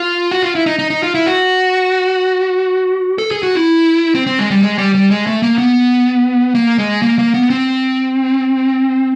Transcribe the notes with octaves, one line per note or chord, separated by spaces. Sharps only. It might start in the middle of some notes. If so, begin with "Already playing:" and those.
Already playing: F4
F#4
F4
E4
D#4
D#4
D#4
F4
E4
F#4
A4
G#4
F#4
E4
C4
C4
G#3
G3
G#3
G3
G3
G#3
A3
A#3
B3
A#3
G#3
A#3
A#3
B3
C4